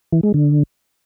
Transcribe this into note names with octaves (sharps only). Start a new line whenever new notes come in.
E3
G#3
D3